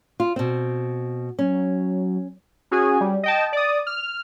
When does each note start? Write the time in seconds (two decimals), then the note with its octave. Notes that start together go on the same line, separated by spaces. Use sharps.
0.20 F4
0.36 B2 C4
1.39 F#3 C#4
2.71 C#4 F#4 G#4 G#5
3.01 G3
3.23 D#5 G5 A5
3.53 D5 D#6
3.87 F6